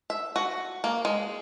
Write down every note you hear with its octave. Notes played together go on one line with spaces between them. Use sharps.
E5
F#4
A#3
G#3